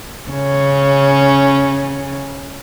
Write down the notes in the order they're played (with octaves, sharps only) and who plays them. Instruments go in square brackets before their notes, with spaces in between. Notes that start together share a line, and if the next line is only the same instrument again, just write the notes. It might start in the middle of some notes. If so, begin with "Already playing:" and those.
[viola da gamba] C#3 C#4